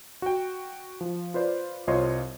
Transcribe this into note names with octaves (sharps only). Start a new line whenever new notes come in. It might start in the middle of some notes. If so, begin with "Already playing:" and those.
F#4 G5
F3
F4 B4 C5 D5
C2 F4 C5 C#5 D#5 C6